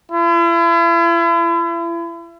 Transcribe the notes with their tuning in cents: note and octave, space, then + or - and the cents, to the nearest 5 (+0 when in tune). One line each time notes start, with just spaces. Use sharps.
E4 +40